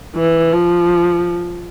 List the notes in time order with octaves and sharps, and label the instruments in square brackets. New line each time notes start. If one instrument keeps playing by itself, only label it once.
[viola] E3
F3